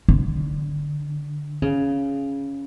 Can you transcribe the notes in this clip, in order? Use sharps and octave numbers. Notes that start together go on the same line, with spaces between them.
D3
C#3